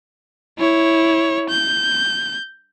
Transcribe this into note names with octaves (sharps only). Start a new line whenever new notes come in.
E4 C#5
G6